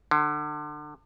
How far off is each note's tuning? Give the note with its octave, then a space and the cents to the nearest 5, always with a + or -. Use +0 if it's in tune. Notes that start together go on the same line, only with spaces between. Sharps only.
D3 +30